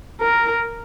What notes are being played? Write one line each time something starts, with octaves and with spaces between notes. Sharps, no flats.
A#4